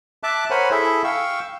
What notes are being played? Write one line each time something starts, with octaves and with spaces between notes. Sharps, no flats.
E5 A5 D6 F#6
A#4 C5 C#5 F#5 G#5 B5
E4 G#4 A4 E5
F5 G5 C#6 E6